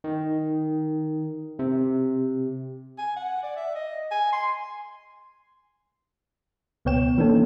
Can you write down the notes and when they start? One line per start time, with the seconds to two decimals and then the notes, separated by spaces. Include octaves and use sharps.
0.04 D#3
1.59 C3
2.98 G#5
3.16 F#5
3.43 D5
3.56 E5
3.75 D#5
4.11 G#5
4.32 C6
6.85 C#2 B2 B3 C#5 G5 E7
7.18 E3 A#3 B3 C#4 D4 A4